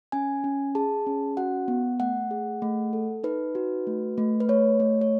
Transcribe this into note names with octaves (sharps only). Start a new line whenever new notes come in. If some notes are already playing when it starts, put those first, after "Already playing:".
C#4 G#5
C#4
G#4 A5
C#4
F#4 F#5
B3
A3 F#5
G#4
A3
A4
D#4 B4
F#4
A3
A3
B4
A3 C#5
A3
C#5